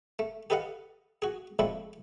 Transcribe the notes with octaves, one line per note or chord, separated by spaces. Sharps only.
A3
G4 A4 B4 D#5 F5 F#5
F#4 G#4
F3 G#3 A3 C4 D4 E4